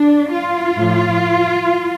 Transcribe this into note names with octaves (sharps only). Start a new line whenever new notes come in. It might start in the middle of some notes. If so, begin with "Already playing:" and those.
Already playing: D4
F4
A2 F3